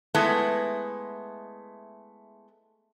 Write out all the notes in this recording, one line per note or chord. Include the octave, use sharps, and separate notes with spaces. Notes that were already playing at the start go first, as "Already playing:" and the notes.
G#3 A3 B3 E4